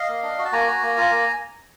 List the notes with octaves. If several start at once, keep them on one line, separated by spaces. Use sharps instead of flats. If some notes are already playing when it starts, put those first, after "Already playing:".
Already playing: D#5 F5
A#3
D4
F#4
A5
A#3 G#5 A#5
F#4
A#3
F4
A#3